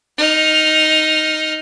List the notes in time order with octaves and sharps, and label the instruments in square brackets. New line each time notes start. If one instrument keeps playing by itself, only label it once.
[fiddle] D#4 F6